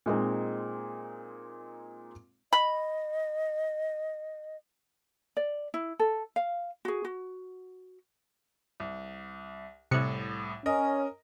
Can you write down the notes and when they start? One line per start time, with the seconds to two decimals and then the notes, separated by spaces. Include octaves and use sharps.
0.06 A#2 G#3 C4 D#4
2.53 D#5 B5
5.37 D5
5.74 E4
6.00 A4
6.36 F5
6.85 F#4 G#4
7.05 F#4
8.80 C2
9.91 C2 A2 C3 F#6 C#7
10.66 C#4 A#4 D#5